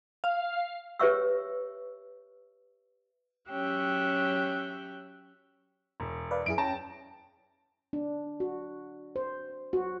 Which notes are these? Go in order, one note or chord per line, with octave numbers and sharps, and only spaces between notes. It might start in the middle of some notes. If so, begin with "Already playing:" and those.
F5
G4 B4 C#5 E5 C#6 E6
F#3 C#4 G4 E5 G5 F#6
E1
B4 D5 F5
F#2 E4 G#4 D7
C#4 G5 A5 A#6
D4
F#4
C5
F#4